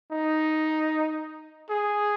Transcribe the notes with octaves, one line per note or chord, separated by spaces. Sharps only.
D#4
G#4